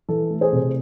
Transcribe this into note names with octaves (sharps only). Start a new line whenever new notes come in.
E3 A4
A3
G#4 C5
C3